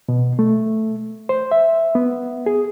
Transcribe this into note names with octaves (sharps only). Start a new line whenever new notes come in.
B2
A3
C5
E5
B3
G#4